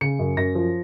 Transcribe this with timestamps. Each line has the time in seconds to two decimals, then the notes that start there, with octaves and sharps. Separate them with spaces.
0.01 C#3 C#7
0.19 F#2
0.37 F#2 A#6
0.55 F3